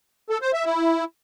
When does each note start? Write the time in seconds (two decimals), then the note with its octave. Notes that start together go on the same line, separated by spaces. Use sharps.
0.30 A4
0.41 C5
0.53 E5
0.65 E4